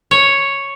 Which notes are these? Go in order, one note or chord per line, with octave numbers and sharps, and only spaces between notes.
C#5